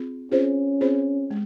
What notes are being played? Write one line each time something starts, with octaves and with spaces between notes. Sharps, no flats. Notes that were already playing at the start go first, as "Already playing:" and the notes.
Already playing: C4 F4 G#4
C4 C#4 F4 G#4 C5
C4 F4 G#4 C5
G#3